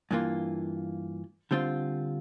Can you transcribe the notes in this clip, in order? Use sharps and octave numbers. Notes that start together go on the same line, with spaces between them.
G2 E3 A#3 F4
D3 G3 C4 F4